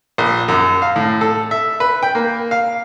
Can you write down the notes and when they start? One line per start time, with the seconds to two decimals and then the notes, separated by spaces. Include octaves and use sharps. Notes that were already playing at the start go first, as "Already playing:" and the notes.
0.18 A#1
0.48 F#2
0.82 F5
0.96 A2
1.21 A4
1.51 E5
1.80 B4
2.03 G5
2.15 A#3
2.51 F5